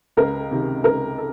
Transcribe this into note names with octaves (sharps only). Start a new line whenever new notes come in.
C#2 A#4
C3 D#3
C#2 A#4
A4